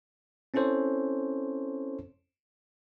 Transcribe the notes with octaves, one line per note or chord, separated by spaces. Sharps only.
C4 C#4 E4 A4 C5 C#5